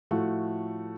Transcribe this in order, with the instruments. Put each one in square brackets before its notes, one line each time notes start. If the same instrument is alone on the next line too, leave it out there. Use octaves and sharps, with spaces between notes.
[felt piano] A2 F3 A3 F#4